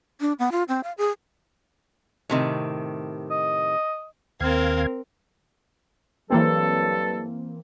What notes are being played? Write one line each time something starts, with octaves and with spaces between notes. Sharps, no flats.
D4
B3
F4
C4
F5
G#4
A2 C3 D#3
D#5
D#2 C4 A#4 F5 G#6
G2 E3 F#3 A#3 C4 A4